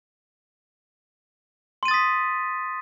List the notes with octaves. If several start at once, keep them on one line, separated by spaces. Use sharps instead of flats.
C6 D#6 A6 B6 D#7